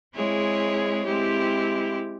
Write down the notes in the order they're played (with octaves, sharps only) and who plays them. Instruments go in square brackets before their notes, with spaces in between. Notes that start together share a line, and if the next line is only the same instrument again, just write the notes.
[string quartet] G#3 C4 E4 G#4 C#5
G#3 C4 E4 G4